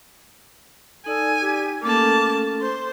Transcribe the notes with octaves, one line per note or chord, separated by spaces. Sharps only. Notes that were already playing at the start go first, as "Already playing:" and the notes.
D#4 A4 D5 G#5
G4
A3 A#3 C#4 A4 A5 D6
C5 C6